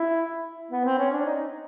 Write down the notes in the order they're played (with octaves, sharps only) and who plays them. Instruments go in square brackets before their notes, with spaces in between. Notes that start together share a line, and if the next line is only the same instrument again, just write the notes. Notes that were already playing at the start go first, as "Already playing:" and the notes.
Already playing: [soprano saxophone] E4
B3
C4
C#4
D4
D#4